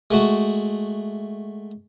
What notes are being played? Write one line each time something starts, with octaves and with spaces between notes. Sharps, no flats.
G#3 A3 F#4